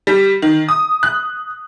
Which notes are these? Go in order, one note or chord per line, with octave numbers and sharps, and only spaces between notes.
G3
D#3
D#6
F#6